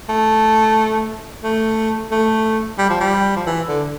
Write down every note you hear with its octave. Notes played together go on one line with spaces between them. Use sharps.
A3
A3
A3
G3
F3
G3
F3
E3
D3